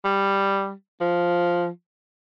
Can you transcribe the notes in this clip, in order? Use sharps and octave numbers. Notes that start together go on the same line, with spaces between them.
G3
F3